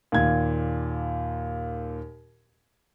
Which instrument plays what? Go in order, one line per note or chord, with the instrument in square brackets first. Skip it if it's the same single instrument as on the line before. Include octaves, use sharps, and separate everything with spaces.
[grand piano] D#2 A#2 G#6